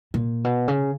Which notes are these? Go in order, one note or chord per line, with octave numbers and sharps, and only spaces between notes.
A#2
B2
C#3